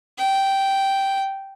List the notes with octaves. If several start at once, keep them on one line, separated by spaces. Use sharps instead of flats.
G5